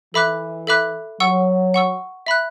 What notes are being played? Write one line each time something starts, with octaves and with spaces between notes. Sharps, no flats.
E3 A4 E5 B5 D6 F#6
A4 E5 B5 D6 F#6
F#3 F#5 C#6 E6
F#5 C#6 E6
E5 B5 F#6